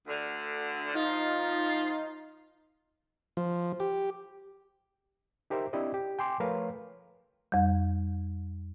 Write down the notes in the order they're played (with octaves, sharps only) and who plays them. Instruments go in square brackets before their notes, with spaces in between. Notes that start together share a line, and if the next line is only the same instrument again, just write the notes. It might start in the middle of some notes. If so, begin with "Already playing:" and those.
[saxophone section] D2 D3
[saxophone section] F3 F4 [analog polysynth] D#4
[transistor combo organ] F3
G4
[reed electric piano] D#4 G4 A#4 C5 E5
C4 D4 E4 G4 D5 D#5
G4
G5 G#5 C6 D6
F3 A3 A#4 B4 C#5 F5
[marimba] F2 G3